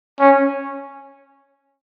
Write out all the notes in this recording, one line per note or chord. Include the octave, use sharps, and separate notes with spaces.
C#4